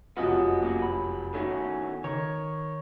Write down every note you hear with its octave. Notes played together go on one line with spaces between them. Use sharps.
F1 F#2 B3 F4 F#4 D#5
A#3 C#4 F#4
B5
E2 D#3 A3 C#4 F#4
D#3 C#5